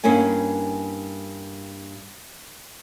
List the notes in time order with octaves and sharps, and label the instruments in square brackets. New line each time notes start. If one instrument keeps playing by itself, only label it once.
[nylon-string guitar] G2 A#3 C#4 E4 G#5